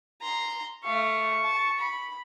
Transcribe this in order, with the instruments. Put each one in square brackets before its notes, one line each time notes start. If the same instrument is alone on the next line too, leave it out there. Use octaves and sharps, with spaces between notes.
[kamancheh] A#5 C6
[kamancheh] A3 F5 [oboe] C#6
[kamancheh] A5
B5